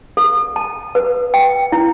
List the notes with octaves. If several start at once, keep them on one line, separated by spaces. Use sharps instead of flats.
A4
A5
B4
G5
E4